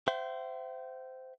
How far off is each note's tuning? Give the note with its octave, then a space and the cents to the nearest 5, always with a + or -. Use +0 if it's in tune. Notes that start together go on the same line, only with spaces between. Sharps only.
C5 -15 E5 +30 G5 -40